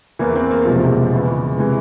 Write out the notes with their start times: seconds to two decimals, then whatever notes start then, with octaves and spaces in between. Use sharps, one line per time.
0.19 E2 E3 A#3
0.35 C4
0.51 A#3
0.65 E1 E2 C3 F3 G#3
1.11 E2 C#3 E3
1.58 C3 E3 G#3